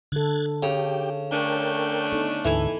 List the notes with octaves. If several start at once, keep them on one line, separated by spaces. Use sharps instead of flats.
D3 A4 F#6 G#6 A6
C#3 G4 G5
A3 C#4 D4 A#4 G5 G6
B3 D#4 A4
D2 G#2 D3 E3 E4 A4 G#5